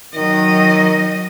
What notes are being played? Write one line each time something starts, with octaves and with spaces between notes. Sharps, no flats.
D#3 F#3 D#5